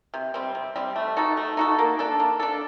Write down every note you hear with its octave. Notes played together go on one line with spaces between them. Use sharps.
C3
G3 C4
C3
G3 C4
A3
D#4 F#4 A4
A3
D#4 F#4 A4
A#3
D4 A4
A#3
D4 A4